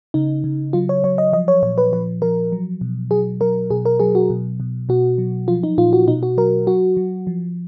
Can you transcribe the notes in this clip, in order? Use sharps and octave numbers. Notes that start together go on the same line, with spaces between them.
C#3 D#4
C#3
F#3 F4
C#5
F#3 C#5
D#5
F3 D#5
C#5
A#2 C#5
B4
F3 B4
F3 A#4
F#3
B2
F#3 G#4
F#3 A#4
B2 G#4
A#4
F#3 G#4
F#4
B2
B2
B2 F#4
F#3
F3 F4
D#4
A#2 F4
F#4
B2 D#4
F#4
F#3 A#4
F#3 F#4
F#3
F3